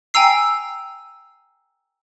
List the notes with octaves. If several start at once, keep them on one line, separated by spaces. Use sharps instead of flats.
G5 G#5 A#5 E6 C7